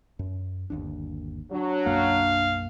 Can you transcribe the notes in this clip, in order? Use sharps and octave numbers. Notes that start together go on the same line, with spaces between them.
F#2
G1 D#2 D4
F#3 D4
B1 F#2 A#3 F5